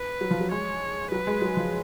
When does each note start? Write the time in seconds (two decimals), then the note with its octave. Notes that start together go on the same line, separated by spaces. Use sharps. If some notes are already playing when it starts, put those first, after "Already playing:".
Already playing: B4
0.21 F#3
0.31 F3
0.40 F#3
0.51 G#3 C#5
1.11 F#3 B4
1.27 G#3
1.42 F#3
1.57 F3